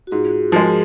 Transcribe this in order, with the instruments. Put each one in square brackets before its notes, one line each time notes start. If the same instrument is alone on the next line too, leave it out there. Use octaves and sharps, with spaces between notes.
[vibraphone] F#4
[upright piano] G#2 [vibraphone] F4 G#4
[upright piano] F3 G#3 [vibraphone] F#4 A#4